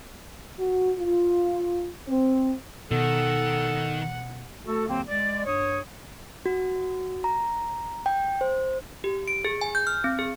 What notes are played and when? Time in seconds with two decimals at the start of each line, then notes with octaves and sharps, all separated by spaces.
0.59 F#4
0.98 F4
2.07 C4
2.91 B2 D#3 A4 F#5
4.65 A3 F#4 A4
4.88 D#2 D3 F#3 A#3 C4
5.08 G#3 D5
5.45 G2 C#5 D#6
6.46 F#4
7.24 A#5
8.06 G5
8.41 C5
9.04 G4
9.28 D7
9.45 G#4
9.61 G#5
9.75 G6
9.87 F6
10.04 C4
10.19 G#4